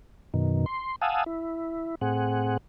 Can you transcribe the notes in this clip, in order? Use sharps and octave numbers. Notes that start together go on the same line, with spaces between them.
F#2 B2 D#3
C6
F5 F#5 G#5 A5 D#6 E6
E4
A2 C4 G#4 F#5